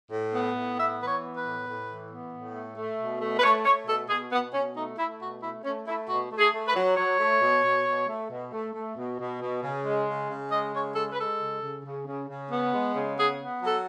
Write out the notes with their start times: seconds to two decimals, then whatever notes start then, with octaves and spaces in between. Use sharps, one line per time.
0.10 A2
0.33 B3
0.55 A2
0.76 B3 E5
1.00 E3 B4
1.06 C#5
1.21 B3
1.36 B4
1.43 A2
1.65 A2
1.87 E3
2.10 B3
2.32 A2
2.53 A3
2.76 A3
2.99 B2
3.20 A3
3.38 B4
3.43 A3 C#5
3.64 A3 C#5
3.87 B2 A4
4.08 B2 G#4
4.32 B2 B3
4.53 B2 C#4
4.75 A3 D#4
4.97 A3 E4
5.20 B2 F#4
5.41 A3 E4
5.63 A3 C#4
5.86 A3 E4
6.08 B2 F#4
6.30 A3
6.38 G#4
6.52 A3
6.67 B4
6.74 F#3
6.96 F#3 C#5
7.18 A3
7.41 B2
7.63 B2
7.86 B2
8.07 A3
8.29 B2
8.52 A3
8.73 A3
8.96 B2
9.18 B2
9.40 B2
9.62 C#3
9.85 G#3
10.07 C#3
10.29 C#3
10.50 G#3 D#5
10.73 C#3 C#5
10.94 G#3 A4
11.12 B4
11.17 G#3 A4
11.39 C#3
11.61 C#3
11.84 C#3
12.06 C#3
12.27 C#3
12.50 B3
12.73 G#3
12.94 C#3
13.16 B3 G#4
13.39 B3
13.61 F#3 A4